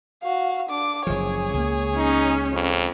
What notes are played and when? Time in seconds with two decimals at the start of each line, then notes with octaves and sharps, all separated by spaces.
0.23 F#4 F5
0.70 D4 D6
1.07 F#1 F3 G#4 C#5
1.54 C#2 A#3
1.97 C#4 D#4
2.53 F2